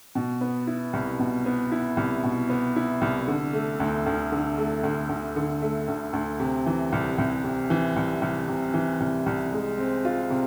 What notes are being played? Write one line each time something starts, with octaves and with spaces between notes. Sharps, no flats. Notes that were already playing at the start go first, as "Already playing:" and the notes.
B2
B3
E4
C2
B2
B3
E4
C2
B2
B3
E4
C2
D3
A3
D2
D2
D3
A3
D2
D2
D3
A3
D2
D2
C3
E3
C2
C2
C3
E3
C2
C2
C3
E3
C2
C2
G#3
C4
F4
C3